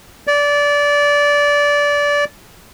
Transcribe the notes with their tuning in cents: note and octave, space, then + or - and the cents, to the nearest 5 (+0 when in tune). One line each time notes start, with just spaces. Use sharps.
D5 -20